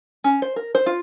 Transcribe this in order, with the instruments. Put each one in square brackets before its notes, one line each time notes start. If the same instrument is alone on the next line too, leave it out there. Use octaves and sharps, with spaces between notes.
[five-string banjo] C#4
C5
A#4
C5
F4